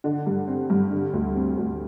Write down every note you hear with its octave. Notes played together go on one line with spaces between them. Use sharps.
D3
G2
C4
G2
D3
D2
C4
D2